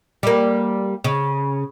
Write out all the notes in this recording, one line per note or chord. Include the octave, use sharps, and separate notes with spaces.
G3 A#3
C#3